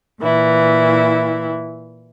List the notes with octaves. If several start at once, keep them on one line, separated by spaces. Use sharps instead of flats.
A#2 E3 E4